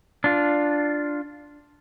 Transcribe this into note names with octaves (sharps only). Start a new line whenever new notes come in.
D4 F4